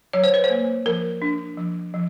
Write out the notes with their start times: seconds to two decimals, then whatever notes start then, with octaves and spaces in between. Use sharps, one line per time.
0.13 F#3 C#5
0.24 C5
0.34 B4
0.44 C5
0.50 A#3
0.86 F3 A#4
1.22 D4
1.57 F3
1.94 F3